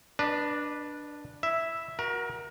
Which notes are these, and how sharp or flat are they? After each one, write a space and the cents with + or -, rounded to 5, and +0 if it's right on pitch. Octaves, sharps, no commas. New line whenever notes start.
D4 +0 B4 -20 D#5 -35
E4 +0 E5 +0
F#4 +0 A#4 +30 A#5 +0